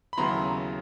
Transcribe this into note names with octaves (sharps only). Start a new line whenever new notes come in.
B5
D#2 C#3 F#3 B3 E4 A#5 C6